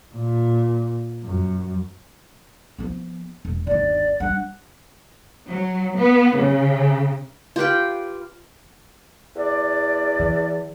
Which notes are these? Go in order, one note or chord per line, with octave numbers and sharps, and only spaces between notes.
A#2
F#2
F3 B3
E1
G1 D#2 D5
G3 D4 F#5
F#3
B3
C#3
F4 G4 B4 G5
E2 D5
E3